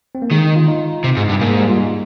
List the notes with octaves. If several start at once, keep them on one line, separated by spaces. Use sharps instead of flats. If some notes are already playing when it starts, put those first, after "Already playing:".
C4
A#3
D#3 G#3
F4
D#4
C3
G#2
G2
G#2 A#3
G#3
G3
F4
D#4